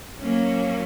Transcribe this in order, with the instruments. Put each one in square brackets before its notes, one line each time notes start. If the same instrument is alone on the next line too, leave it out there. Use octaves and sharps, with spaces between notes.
[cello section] F#3 A#3 C#4